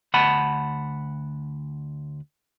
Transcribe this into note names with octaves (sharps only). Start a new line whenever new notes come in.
D2 F#5 A5 B5